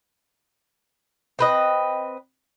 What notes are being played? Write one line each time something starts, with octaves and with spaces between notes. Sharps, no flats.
C4 B4 D#5